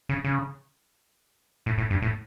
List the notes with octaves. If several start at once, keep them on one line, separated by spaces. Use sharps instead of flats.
C#3
C#3
A2
A2
G2
A2